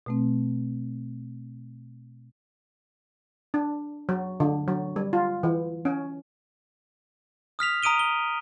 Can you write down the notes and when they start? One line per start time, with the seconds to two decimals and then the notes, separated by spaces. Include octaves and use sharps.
0.06 B2 A3 C4
3.54 D4
4.09 F#3
4.40 D3
4.68 F#3
4.96 G3
5.13 F4
5.43 E3
5.85 C#4
7.59 D#6 F6 B6 F7
7.83 A#5 D#6 D7 D#7 G7
7.99 G7